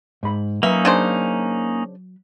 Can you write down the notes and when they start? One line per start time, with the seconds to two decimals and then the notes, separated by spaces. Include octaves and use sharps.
0.23 G#2 B5
0.63 F#3 A#3 C#4 D#4 B4 E5
0.85 C#3 D4 C5